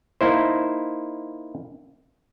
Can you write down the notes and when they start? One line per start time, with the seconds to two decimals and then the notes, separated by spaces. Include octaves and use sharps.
0.21 A#3 D#4 E4 C5